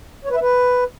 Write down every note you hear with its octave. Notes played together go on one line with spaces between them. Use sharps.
C#5
B4
E5
B4